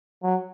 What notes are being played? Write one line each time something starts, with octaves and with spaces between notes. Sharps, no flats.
F#3